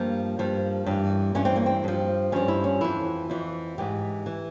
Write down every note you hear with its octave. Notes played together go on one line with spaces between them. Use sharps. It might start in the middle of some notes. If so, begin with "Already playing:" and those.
Already playing: G2 F3 A#3
G2 F3
G2 E3
G2 E3 C#4
C4
A#3
C4
G2 F3
G2 F3 C#4
E4
C#4
F2 E3 E4
F2 E3
G#2 E3 G4
E3